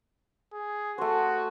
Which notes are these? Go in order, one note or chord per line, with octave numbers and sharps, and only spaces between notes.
G#4
A3 F#4 C5